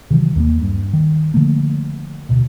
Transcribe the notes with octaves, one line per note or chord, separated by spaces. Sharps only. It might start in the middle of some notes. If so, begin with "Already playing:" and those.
C3 D#3 E3 F#3
D#2 A3 A#3
G2
D#3
D3 F3 A3 A#3
D2 B2